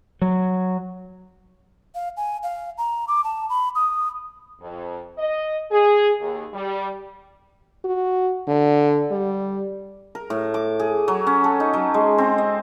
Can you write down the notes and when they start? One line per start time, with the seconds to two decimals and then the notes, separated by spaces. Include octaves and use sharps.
0.22 F#3
1.95 F5
2.17 G#5
2.43 F5
2.78 A#5
3.08 D6
3.24 A5
3.49 B5
3.75 D#6
4.61 F2
5.18 D#5
5.72 G#4
6.21 D#2
6.54 G3
7.85 F#4
8.48 D3
9.11 G3
10.15 A#4
10.30 A2
10.54 D6
10.80 G#4
11.08 F#3
11.27 C#4
11.44 A4
11.60 D#4
11.73 F#3
11.94 G#3
12.18 C4
12.38 D#5